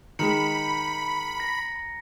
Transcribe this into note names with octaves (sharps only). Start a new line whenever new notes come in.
D#3 G#3 A#5 B5 C#7
A#6